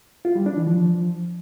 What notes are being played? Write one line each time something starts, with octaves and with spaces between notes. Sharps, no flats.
F4
G3
D4
E3
F3